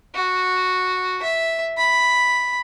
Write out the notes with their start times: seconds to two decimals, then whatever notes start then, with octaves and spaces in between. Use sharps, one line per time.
0.15 F#4
1.23 E5
1.78 B5